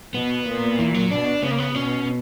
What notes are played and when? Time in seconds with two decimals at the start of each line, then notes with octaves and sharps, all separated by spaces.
0.14 B2 B3
0.47 A#2
0.79 E3
0.94 F#3
1.11 B2 D4
1.43 C#3 B3
1.51 A#3
1.58 B3
1.75 B2 C#4